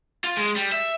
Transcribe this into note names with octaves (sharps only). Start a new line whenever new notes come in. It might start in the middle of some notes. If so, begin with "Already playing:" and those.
F4
G#3
G3
E5